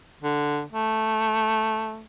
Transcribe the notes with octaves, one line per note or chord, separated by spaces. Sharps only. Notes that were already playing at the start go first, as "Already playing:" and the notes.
D3
A3